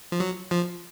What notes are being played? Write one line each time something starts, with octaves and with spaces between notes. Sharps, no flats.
F3
F#3
F3